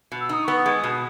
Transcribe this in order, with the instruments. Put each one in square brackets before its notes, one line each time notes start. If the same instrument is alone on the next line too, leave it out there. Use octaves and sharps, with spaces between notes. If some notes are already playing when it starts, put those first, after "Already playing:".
[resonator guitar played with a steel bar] B2
[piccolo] E6
[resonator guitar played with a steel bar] D#4 [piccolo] D#6
[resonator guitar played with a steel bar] B3 [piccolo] C#6
[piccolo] D#6
[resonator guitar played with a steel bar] G#3
B2